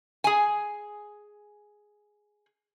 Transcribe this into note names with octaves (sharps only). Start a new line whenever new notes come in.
G#4 G#5